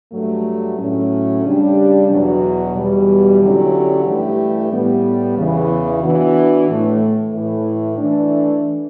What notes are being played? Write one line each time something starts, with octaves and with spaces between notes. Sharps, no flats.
G2 F#3 A3
A2 F#3 A3 C#4
C#3 G3 D4 G4
E2 B2 F#3
E2 B2 G3
D3 F#3 C#4 E4 G4
G2 E3 A3 E4 G4
A2 G3 B3
E2 C#3 E3 B3
E3 B3 D4 F#4
A2 E3 A3
A2 E3 A3 E4
E3 A3 D4